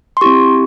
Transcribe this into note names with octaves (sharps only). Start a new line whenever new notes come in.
C6
C4 E4 G4 C#6